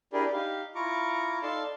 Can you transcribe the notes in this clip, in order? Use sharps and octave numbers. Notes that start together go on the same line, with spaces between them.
D4 E4 G4 G#4 A#4 D5
D#4 G4 F5
E4 F4 A#5 C#6 D6
D#4 A4 D5 F5 A5 C6